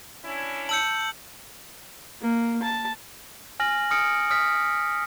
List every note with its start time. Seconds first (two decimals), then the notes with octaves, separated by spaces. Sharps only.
0.25 C#4 D4 E4
0.69 A5 E6 G6 C#7 F#7
2.21 A#3
2.62 A5
3.60 G#5 F6 A#6 F#7
3.91 D#6 F6 C#7 D7
4.30 D#6 F6 B6